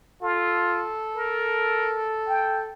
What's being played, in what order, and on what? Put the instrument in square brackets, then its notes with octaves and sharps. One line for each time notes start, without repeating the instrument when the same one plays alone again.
[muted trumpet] F4 [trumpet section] A4
[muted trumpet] A#4
G5